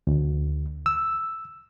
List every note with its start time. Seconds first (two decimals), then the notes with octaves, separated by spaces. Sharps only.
0.07 D2
0.86 E6